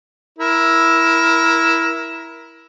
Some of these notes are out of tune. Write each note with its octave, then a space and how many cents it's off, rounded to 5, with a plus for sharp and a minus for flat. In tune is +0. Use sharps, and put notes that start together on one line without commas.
E4 +0 A#4 +15